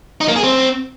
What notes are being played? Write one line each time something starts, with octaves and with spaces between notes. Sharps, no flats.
D#4
A#3
G#4
C4